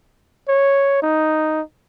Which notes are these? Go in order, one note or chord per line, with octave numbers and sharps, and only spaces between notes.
C#5
D#4